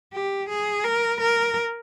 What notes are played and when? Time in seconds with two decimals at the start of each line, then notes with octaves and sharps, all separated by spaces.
0.13 G4
0.49 G#4
0.85 A#4
1.21 A#4